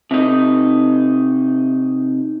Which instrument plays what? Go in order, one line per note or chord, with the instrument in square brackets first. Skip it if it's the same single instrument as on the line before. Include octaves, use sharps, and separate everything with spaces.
[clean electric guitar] C3 D#4